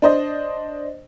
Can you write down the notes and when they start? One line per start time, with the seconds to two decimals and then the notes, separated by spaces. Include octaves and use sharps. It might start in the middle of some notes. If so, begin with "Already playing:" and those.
0.02 D4 C5 D#5